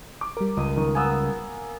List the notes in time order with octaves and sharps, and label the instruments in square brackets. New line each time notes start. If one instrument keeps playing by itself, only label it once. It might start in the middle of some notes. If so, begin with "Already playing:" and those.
[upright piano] D6
[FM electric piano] G3 A#4
[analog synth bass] C#2 [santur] D#5
[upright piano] D#3
[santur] A#3 B3 E6 [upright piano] G#5 D#6